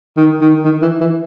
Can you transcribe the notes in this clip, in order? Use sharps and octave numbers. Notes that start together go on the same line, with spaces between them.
D#3
D#3
D#3
E3
E3